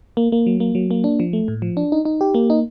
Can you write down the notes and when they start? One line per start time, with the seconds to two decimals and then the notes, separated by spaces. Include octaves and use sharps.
0.17 A#3
0.32 A#3
0.47 F#3
0.60 A#3
0.75 F#3
0.91 A#3
1.04 D4
1.20 F3
1.33 A3
1.48 A2
1.62 F3
1.77 D4
1.92 D#4
2.05 D#4
2.21 G4
2.34 A#3
2.50 D#4